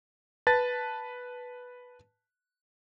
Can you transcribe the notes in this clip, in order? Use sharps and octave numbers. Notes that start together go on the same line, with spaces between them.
B4 A5 A6